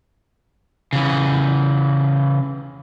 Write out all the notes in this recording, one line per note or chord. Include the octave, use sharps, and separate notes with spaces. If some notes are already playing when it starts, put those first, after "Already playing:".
C#3 E3